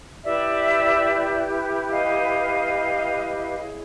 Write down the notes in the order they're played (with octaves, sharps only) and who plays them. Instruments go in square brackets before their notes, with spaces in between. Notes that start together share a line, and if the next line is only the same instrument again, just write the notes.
[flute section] E4 G4 B4 D5 E5
D#5 F5
E4 G#4 C#5